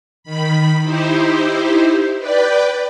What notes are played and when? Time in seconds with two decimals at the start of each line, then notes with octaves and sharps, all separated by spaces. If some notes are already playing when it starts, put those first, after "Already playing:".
0.23 D#3 B5
0.82 D#4 E4 G4 C5
2.18 B4 D5 G5